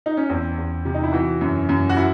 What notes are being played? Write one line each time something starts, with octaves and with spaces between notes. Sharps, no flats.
D#4
C#4
E2 C4
E2
C3
D#4
E4
E3 F#4
F#2
F#2
F#4
E4